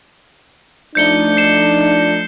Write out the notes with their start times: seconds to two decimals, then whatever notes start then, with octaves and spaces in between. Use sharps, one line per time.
0.95 F3 A3 D4 D#4 G6 C#7 G7
1.37 C7 E7